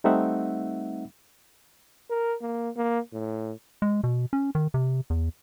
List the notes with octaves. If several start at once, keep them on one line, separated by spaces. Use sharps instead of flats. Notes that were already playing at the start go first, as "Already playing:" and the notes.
G3 A3 C4 D#4 E5 F#5
A#4
A#3
A#3
A2
G#3
B2
C#4
D#3
C3
E2